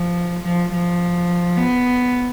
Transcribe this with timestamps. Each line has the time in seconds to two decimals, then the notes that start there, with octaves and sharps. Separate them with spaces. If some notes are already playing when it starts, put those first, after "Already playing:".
Already playing: F3
0.44 F3
0.72 F3
1.57 B3